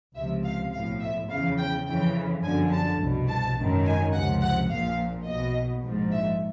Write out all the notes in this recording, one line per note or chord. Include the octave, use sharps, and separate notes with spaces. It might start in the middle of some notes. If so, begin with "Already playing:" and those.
C#2 C3 F3 E5
F5
B1 A2 F3 F5
E5
E2 C#3 F3 F5
G5
F2 C#3 E3 G5
G1 F#2 D3 F3 G#5
A5
C2 B2
A5
G#1 F#2 D#3
G#5
C#2 C3 F3 F#5
F#5
A#1 A#2 F3 F5
B1 B2 D#5
A#1 G#2 F3
E5